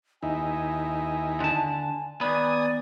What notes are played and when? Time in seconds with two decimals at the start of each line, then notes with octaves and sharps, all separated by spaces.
0.23 D#2 D#4 E4 G#5
1.40 D3 A5
2.21 D#3 B3 D5 G#5 D#6